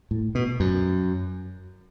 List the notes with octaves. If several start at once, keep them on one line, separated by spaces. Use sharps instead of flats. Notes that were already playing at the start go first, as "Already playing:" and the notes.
A2
B2
F#2